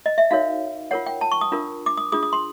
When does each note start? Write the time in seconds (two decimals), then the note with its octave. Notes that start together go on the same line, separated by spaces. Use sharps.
0.06 D#5
0.18 E5
0.31 D#4 F#4 A#4 C#5 F5
0.91 F4 A#4 C#5 F#5
1.06 G5
1.21 A5
1.32 C#6
1.41 D#6
1.52 D4 F4 A#4
1.86 D6
1.97 D#6
2.12 D4 F4 G#4 D#6
2.23 D#6
2.33 C6